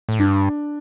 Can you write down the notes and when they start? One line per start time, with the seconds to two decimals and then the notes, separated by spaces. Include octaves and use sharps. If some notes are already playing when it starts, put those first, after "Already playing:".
0.09 A2
0.19 G2 D4